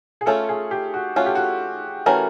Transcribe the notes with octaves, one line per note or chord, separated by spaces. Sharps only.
G#4
A3 C#4 F4 A4
G#4
G4
F#4
A3 C#4 F4 F#4
G4
F#4
E3 A3 C#4 F#4 A#4